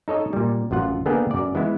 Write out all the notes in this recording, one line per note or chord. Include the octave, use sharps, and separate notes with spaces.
D#4 A4 C#5 D#5
A#2 G3
A1 F#2 F4 F#5
D3 A#3 B3 G#4 A#4 G5
F#2 D5
E3 G#3 B3 E4